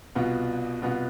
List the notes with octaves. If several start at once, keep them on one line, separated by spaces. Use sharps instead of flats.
C2 B2 B3 F4
C2 B2 B3 F4